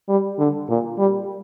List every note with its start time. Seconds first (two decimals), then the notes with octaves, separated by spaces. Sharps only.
0.09 G3
0.39 D3
0.69 A#2
0.98 G3